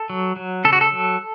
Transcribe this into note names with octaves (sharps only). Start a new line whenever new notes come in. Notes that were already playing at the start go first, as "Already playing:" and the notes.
Already playing: A4
F#3
F#3
C#3 A4
F#4
A4
F#3